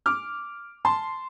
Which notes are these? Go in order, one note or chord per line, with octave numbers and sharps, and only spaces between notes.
D6 F6
A5 C6